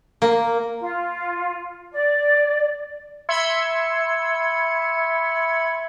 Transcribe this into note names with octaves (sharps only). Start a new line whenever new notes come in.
A#3
F4
D5
E5 B5 C6 E6 G#6 C#7